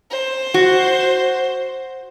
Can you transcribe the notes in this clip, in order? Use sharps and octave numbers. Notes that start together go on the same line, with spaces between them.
C5
F#4